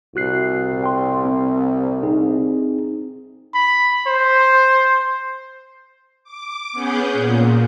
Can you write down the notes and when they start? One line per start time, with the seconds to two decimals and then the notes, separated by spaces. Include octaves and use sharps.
0.16 C2 F#4 F#6 C7
0.84 G5 C6
1.25 C4
2.03 C4 D#4 G#4
3.54 B5
4.07 C5
6.24 D6
6.72 B3 C#4 G#4 F#5 G6
7.13 A#2